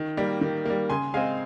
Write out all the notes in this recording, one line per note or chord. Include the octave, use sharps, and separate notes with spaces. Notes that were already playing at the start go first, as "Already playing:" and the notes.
Already playing: D#3
G3 A#3
D#3
G3 A#3
C#3 G#5 C6
G#3 C4 F5 G#5